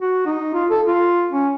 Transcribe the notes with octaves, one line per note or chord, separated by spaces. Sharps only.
F#4
D#4
F4
A4
F4
C#4